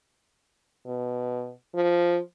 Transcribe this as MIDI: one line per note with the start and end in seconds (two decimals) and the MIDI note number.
0.86 1.52 47
1.75 2.20 53